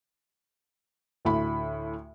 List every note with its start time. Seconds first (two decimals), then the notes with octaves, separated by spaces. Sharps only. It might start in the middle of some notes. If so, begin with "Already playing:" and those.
1.25 D2 A2 B5